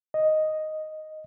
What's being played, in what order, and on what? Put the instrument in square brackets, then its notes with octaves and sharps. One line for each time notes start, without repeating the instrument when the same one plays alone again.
[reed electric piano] D#5